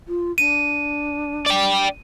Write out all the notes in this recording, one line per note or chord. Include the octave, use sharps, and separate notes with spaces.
F4
D4 D#7
D5 G5